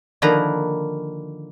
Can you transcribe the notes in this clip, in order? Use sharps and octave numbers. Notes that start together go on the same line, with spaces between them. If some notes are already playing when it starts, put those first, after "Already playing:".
D3 D#3 F3 A#3 B4 A#5